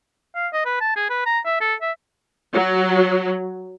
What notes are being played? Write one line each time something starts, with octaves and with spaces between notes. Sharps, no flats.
F5
D#5
B4
A5
G#4
B4
A#5
E5
A4
E5
F#3